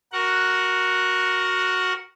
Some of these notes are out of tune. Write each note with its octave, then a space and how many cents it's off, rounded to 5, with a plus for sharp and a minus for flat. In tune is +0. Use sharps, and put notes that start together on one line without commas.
F#4 +0 A#4 +10 F#5 +0